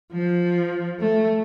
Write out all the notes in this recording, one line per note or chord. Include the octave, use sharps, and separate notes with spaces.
F3
A3